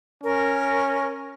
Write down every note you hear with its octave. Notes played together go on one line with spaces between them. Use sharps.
C#4 A#4